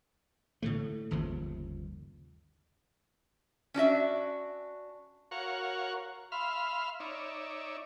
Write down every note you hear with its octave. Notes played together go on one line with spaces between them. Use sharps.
A2 D3 A3
G1 D#2 C#3 F3
C#4 D4 F#4 E5
F#4 A#4 C#5 F5 F#5 C#6
E5 F5 B5 C6 F6
D#4 C#5 D5 E5